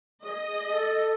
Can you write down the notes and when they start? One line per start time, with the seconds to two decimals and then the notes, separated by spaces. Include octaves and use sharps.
0.23 G#4 D#5
0.47 G#4
0.67 G#4
0.73 A4